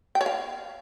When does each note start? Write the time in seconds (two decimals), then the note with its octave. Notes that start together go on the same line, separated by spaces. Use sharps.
0.15 G5
0.21 C#5
0.26 F5